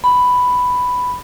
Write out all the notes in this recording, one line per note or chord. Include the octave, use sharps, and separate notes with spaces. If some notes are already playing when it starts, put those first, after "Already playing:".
B5